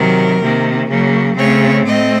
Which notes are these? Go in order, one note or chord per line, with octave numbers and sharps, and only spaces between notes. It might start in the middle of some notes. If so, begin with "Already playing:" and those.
Already playing: C3 D#3 F#3 A#4
C3 D#3 A#3
C#3 F#3 A#3
C#3 A3 C4 C#5
A2 A3 C4 D#5